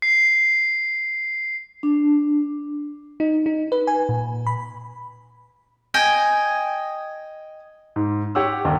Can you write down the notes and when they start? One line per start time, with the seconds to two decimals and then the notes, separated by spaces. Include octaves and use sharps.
0.02 C7
1.83 D4
3.20 D#4
3.46 D#4
3.72 B4
3.87 G#5
4.09 A#2
4.47 B5
5.94 D#5 G5 G#5
7.96 G#2
8.35 G4 C#5 F#5 D6 E6
8.65 G1 D#2